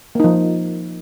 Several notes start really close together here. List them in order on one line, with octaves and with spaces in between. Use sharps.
A#3 D#4 F3